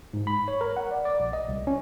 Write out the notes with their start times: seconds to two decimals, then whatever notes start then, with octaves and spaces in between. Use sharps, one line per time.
0.13 G#2
0.27 B5
0.48 C#5
0.61 A#4
0.77 F#5
0.91 D5
1.05 D5
1.20 A#1
1.33 D#5
1.48 C2
1.67 C#4